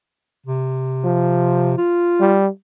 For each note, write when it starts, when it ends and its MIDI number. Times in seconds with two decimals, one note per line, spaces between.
0.46 1.77 48
1.04 1.75 53
1.77 2.37 65
2.20 2.47 55